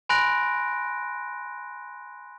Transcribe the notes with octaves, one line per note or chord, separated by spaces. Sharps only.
G#5 B5 C6 F#6 A#6 D7